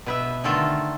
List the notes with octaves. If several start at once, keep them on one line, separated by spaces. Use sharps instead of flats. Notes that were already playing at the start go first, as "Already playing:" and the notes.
B2 B4 E5
D3 D#3 A3 F4 A4 A#4